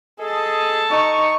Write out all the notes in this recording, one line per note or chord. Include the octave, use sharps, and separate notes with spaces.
G#4 A4 D#5 A5
D#4 C#6